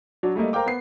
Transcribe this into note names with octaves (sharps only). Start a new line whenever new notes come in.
F#3 D4 F#4
G3 A3 A#3 D#5
A#4 C5 F5 G5 D6
B3 C7